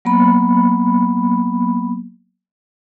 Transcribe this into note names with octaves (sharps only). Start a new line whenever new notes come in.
F#3 A#3 B3 B5